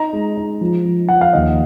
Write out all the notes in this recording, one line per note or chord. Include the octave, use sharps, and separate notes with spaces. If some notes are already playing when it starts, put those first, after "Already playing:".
Already playing: D#4 A#5
G#3
D#4
F3
F3
F3 F#5
F5
D#2 D#5